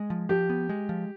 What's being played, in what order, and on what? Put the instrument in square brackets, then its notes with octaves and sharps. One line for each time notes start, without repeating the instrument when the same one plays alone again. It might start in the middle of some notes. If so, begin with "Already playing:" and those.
Already playing: [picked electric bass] G#3
F3
[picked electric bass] F3 [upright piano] G4
[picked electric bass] B3
G#3
F3